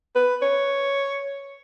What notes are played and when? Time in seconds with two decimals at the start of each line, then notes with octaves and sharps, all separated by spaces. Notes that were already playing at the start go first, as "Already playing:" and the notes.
0.16 B4
0.42 C#5